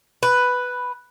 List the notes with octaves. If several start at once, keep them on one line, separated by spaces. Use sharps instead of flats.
B4